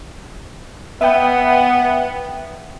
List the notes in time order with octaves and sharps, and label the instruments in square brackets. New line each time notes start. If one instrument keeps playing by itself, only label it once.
[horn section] B3 [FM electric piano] E5 G5